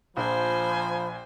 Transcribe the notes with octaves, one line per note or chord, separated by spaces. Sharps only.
A#1 F3 C5 G#5 B5